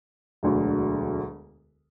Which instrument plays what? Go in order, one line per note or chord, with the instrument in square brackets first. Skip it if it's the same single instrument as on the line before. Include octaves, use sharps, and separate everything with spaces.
[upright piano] E1 D2 D3 F#3